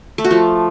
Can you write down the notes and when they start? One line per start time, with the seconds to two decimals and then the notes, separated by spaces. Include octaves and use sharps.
0.18 A3
0.24 F#4
0.31 F3